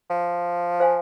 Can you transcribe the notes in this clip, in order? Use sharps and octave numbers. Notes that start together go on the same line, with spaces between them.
F3
C5 F5 G#5